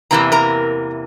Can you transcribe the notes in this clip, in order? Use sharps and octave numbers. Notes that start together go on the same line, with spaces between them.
E2 C3 E3 A#3 A#5
A#4 A#5